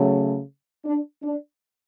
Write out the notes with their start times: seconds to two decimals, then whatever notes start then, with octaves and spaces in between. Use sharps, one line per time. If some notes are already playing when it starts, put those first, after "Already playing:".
Already playing: C#3 F#3 A3
0.85 D4
1.23 D4